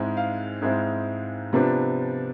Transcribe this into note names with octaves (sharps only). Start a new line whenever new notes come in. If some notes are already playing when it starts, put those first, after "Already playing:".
Already playing: G#2 G#3 C4 E4
F5
G#2 G#3 C4 E4
C3 F3 B3 D4